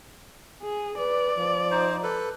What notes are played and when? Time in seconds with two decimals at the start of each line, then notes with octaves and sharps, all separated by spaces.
0.62 G#4
0.98 B4 D5
1.36 F3
1.71 D#4 C5
2.03 A4 B4